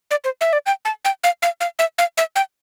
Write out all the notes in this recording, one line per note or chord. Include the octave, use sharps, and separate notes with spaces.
D5
C5
E5
D5
G5
A5
G5
F5
F5
F5
E5
F5
E5
G5